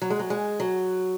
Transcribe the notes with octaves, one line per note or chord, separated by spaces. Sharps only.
F#3
G#3
F#3
G#3
F#3